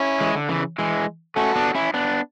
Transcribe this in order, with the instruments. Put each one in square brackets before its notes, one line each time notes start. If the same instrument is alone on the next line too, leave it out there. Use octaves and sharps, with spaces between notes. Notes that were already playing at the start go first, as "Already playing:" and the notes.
Already playing: [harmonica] C#4 E4
[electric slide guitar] E3 G#3
D3
C#3 E3
E3 G#3
[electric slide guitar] A3 C#4 [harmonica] F#4 A4
[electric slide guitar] B3 D4
C#4 E4
B3 D4